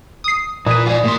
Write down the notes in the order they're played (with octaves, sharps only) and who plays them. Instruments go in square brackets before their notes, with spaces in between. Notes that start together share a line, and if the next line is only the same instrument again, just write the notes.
[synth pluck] D#6 C7
[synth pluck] A#2 [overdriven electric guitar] E3 [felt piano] D#6 D#7
[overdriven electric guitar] E3 F4 [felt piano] D5 G#5
[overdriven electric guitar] A2 C6 [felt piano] A#3